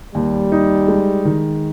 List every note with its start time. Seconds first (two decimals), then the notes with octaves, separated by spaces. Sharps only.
0.14 D#2 G3
0.52 D#4
0.88 G#3
1.25 D#3